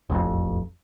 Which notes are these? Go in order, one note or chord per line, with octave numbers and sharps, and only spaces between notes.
E1 A1 F2